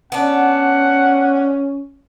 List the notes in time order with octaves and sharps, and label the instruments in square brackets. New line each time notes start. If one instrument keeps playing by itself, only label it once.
[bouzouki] B3 D4 [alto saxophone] C#4 [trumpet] F#5